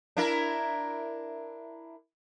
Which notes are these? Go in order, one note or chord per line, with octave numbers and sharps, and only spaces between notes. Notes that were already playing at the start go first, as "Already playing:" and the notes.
D4 E4 A#4